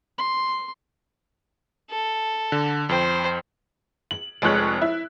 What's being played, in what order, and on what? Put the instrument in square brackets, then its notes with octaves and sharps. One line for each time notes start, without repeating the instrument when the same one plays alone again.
[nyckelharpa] C6
[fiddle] A4
[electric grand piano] D3
[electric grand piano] F2 G5 [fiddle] C5
[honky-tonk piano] F#7
F1 F2 G#3 C#5 F#6 F#7
E4